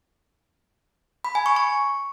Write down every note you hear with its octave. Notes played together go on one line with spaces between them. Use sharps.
B5
G#5
C#6
C#6